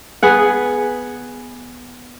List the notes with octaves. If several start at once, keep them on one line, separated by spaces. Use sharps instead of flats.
B3 G#4 F#5